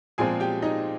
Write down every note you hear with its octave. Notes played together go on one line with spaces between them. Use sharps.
A#2 F3 G#3 C4 G#4 G#5
G4 G5
D#4 D#5